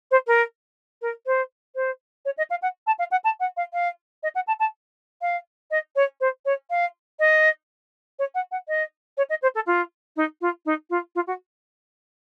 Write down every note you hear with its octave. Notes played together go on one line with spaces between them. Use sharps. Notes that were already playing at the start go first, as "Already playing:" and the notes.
C5
A#4
A#4
C5
C5
C#5
D#5
F5
F#5
A5
F5
F#5
A5
F#5
F5
F5
D#5
F#5
A5
A5
F5
D#5
C#5
C5
C#5
F5
D#5
C#5
F#5
F#5
D#5
C#5
D#5
C5
A4
F4
D#4
F4
D#4
F4
F4
F#4